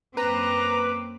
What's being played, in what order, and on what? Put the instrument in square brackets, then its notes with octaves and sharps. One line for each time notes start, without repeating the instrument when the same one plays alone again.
[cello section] F#2 A#3 C4 [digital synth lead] B4 [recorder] A#5 [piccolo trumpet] D6